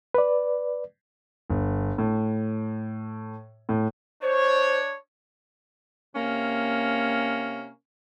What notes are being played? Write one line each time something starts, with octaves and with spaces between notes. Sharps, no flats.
B4 D5
G1
A2
A2
D4 C5 C#5
C3 A#3 C#4